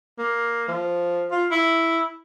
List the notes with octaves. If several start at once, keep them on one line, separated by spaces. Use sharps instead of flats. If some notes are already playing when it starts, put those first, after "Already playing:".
A#3
F3
F4
E4